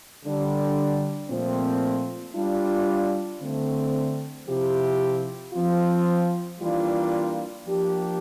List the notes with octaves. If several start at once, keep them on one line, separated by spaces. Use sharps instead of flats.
D3 G3 D4
A#2 F3 A3 C4
G3 D4 F4
D3 A3 C4
C3 F3 C4 E4 G4
F3 C4 F4
E3 G3 A#3 D4 F4
F3 A#3 D4 G4